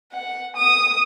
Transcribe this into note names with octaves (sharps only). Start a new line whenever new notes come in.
F#5
D#6